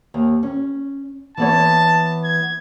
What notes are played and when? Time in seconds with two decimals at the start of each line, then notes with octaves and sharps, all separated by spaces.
0.14 D#2
0.43 C#4
1.37 E3 B3 C#5 A5
2.24 G#6